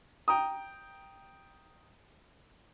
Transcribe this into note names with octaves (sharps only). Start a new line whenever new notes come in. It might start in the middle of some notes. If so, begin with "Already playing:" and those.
G5 A#5 D#6